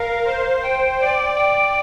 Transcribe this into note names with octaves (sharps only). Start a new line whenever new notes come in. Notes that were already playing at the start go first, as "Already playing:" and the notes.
Already playing: A#4 F5
C5
G5
D5
G5